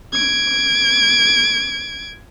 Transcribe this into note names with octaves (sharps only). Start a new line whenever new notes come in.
G#6 D7